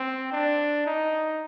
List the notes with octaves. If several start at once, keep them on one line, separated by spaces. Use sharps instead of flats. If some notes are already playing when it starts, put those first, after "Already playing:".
Already playing: C4
D4
D#4